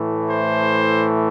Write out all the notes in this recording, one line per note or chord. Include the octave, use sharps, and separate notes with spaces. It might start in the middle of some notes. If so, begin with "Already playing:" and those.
Already playing: A2 E3 A3
C5